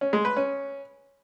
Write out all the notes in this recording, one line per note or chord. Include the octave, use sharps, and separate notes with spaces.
C#4
G#3
B4
C#4